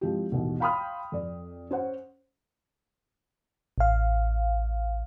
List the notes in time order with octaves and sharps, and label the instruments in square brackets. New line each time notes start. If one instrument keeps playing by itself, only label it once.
[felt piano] F3 G#3 C4 E4 G4
A1 D#2 B2
F5 G5 B5 C6 D#6 F6
F2 D5
C#4 C5 F#5
[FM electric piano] A1 F5